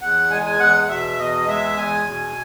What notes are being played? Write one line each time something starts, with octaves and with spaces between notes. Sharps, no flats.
E2 F#5
G#3 G#5
G#5
E2 F#5
F#5
B2 E5
E2 D#5
G#3 E5
E2 G#5
B2